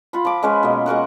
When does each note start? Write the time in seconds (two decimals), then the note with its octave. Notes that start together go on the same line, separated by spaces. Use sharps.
0.13 F4 F#5 B5
0.25 F3 D6
0.43 G#3 C#4 B4 C#5
0.63 B2 A#3
0.86 G#3 F#4 A#4 F#5